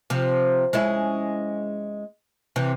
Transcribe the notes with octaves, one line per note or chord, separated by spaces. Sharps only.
C3 F3
G#3 C#4 E4
C3 E3